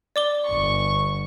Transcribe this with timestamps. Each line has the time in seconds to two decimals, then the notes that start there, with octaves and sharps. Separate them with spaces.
0.16 D5 D6 G7
0.47 G1 C#6